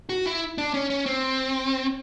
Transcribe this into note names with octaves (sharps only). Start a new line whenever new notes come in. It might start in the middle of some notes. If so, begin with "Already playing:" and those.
F#4
E4
D4
C#4
C#4
C4